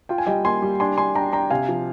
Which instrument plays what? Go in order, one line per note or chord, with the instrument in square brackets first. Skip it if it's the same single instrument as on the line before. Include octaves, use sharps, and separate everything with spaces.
[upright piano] F4 [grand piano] G5
[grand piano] G#5
[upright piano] G3 [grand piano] D#5 G5
[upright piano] A#3 [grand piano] G#5 C6
[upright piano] G3
[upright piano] D4 [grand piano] G#5 C6
[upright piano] D4 [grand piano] G#5 C6
[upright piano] D4 [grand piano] G5 A#5
[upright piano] D4 [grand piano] G5 A#5
[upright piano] C3 [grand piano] F5 G#5
[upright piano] F3